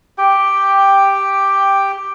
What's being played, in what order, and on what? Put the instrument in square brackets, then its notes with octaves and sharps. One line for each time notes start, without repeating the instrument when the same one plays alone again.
[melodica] G4 G5